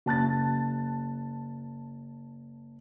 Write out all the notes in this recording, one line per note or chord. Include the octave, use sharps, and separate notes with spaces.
F#1 A5 F#6 A6